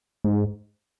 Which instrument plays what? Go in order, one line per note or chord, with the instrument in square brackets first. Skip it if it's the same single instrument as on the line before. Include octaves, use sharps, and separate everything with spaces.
[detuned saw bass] G#2